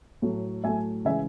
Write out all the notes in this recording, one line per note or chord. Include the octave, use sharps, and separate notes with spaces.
A2 F#3 A3
A2 F#3 A3 E5 G#5
C#3 E3 G#3 E5 G#5